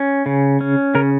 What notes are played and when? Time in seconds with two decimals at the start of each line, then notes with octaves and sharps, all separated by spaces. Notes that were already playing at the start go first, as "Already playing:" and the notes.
Already playing: C#4
0.26 C#3
0.61 C#4
0.95 C#3 A#4